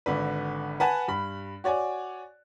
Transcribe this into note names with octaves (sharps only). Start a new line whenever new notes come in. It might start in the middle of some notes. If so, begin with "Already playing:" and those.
G#1 D3 B4
B4 F#5 G#5 A5
G2 B5
F#4 C#5 D5 G#5